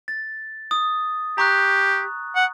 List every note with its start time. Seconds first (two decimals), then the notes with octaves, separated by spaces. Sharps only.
0.08 A6
0.71 D#6
1.38 G4 A#5 C#6 F#6
2.35 F#5